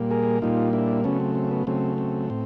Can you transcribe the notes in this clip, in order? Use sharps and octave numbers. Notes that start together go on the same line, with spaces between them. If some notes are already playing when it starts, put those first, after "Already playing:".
Already playing: A#2 G3 A#3
G#4 A#4
A#2 G3 A#3 D#4 F4
D4 E4
C#3 F#3 A3 B3 C#4
C4
C4
B3
C#3 F#3 A3 C4
C4
A2 C4